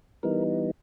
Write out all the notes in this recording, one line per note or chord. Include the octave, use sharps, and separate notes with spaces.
E3 G3 B3 D#4 A#4